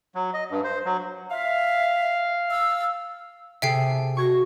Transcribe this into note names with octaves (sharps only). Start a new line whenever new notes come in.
F#3
D#5
G2
C5
F#3
E5 F5
E6
C3 G#4 A4 E5 G5 C7
F#4 C#6 G#6 A#6